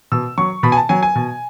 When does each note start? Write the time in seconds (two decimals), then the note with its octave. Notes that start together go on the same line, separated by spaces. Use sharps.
0.12 B2 E6
0.38 F#3 C#6
0.63 B2 B5
0.72 G#5
0.77 A5
0.89 F#3 G#5
1.03 G#5
1.16 B2